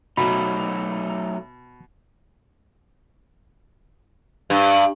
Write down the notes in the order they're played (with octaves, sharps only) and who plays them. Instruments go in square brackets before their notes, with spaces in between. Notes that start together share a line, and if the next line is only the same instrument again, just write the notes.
[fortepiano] B2 [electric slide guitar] F#3 A3 D#4 [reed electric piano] B5
[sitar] G2